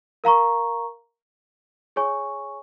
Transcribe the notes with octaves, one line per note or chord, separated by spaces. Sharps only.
A#4 F5 A#5 C#6
G#4 C#5 G#5 C#6